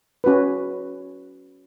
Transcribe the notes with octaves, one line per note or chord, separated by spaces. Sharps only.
C#4 F#4 B4